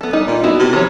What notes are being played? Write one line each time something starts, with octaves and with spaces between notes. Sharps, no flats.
B3 A4
G3 D#4
A#2
B3 E4 F#4
C3
D#3 F3 C#5